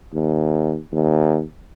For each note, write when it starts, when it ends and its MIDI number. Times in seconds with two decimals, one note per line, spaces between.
0.14 0.78 39
0.93 1.42 39